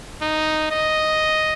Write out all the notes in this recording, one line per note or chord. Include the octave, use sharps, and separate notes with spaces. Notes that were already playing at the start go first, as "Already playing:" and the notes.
D#4
D#5